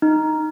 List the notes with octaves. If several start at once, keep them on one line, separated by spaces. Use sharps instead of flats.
D#4